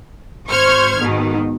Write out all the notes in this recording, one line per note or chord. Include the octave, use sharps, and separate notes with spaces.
G#1 C5 C#6 F6 G#6
G#2 B2 D#3